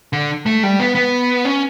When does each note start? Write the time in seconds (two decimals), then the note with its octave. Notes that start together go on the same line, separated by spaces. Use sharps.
0.13 D3
0.46 A3
0.63 G3
0.80 B3
0.95 B3
1.45 C#4